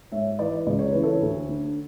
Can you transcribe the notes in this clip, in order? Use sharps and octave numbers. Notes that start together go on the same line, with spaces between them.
G#2 C#5 E5
E3 B4 D5
C#2 D5
C#5
C#3 E3 B4
A4 C#5
D2
D3